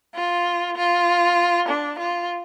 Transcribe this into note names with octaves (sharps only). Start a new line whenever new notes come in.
F4
F4
D4
F4